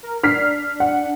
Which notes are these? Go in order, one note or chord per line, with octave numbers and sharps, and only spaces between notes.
A#4
D4 F6 B6 C7
F#5